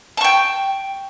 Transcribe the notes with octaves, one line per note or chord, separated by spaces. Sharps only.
G5 A5 C#6